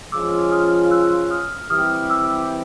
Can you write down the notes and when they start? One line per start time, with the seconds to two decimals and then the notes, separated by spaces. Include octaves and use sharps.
0.12 F3 G#3 C#4 F4 D6 E6
0.51 D#6 F6
0.91 E6 F#6
1.31 D#6 F6
1.70 E3 G3 C4 E4 G4 D#6 F6
2.10 D6 E6